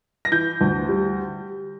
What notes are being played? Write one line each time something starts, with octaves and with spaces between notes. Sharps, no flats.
A#6
E3 G6
D2
G3